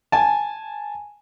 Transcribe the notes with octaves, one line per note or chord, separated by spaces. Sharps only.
G#5 A5